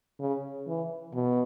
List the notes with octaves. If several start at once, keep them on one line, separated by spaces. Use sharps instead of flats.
C#3
E3
B2